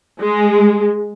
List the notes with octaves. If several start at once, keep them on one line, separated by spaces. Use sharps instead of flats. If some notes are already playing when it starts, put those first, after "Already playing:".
G#3